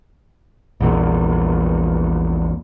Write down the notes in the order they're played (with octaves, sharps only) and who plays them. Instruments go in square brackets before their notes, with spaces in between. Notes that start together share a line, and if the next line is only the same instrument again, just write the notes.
[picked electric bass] A#1 E2 A#2